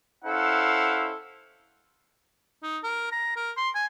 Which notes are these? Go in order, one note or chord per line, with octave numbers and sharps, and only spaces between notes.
C#4 E4 A4 C5 F5 F#5
D#4
A#4
A#5
A#4
C6
G#5